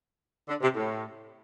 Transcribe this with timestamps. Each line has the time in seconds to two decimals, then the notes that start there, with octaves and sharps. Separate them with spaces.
0.48 D3
0.61 C3
0.75 A2